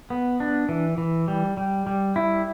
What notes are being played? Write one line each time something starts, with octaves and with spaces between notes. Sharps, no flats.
B3
D4
E3
E3
G3
G3
G3
E4